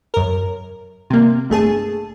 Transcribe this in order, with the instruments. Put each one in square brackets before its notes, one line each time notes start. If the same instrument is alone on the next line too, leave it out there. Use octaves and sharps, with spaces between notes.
[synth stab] F#2 A#4
C3 A#3
G1 A3 G#4 A5